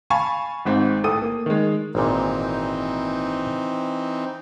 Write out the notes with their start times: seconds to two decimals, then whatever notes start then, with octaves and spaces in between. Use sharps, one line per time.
0.10 F5 G#5 A5 B5 C#6
0.65 G#1 G#2 C4
1.04 A1 A4 D#6 D#7
1.22 A#3
1.46 D#3 G#3
1.95 G#1 A#2 E3 C4 D#4